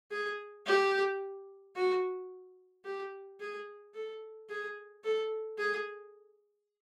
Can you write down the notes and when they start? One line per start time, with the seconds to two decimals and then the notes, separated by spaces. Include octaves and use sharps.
0.11 G#4
0.67 G4
1.76 F#4
2.85 G4
3.40 G#4
3.95 A4
4.49 G#4
5.04 A4
5.59 G#4